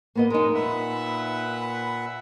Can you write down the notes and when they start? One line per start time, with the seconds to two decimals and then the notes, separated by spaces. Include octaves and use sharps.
0.15 A#3 B3 D#5
0.30 F2 G#3 D#4 A#4
0.54 A#2 B4 E5 F#5